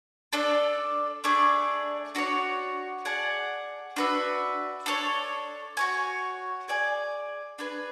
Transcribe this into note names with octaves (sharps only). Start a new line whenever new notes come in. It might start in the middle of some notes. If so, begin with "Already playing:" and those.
D4 A4 D5 A5
A3 D4 G#4 D5
D4 F#4 A4 C#5
G#4 D5 F#5 A5
D4 F#4 B4 E5
D4 A4 C#5
F#4 C#5 G#5
G#4 D5 G#5
D4 G#4 B4